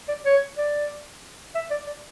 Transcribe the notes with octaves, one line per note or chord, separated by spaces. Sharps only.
D5
C#5
D5
E5
D5
D5